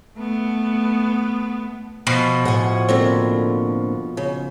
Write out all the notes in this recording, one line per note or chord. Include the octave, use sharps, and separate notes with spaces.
A3 B3
B2 F3
A2 F#5 G#5
D3 A#3 C4
C#3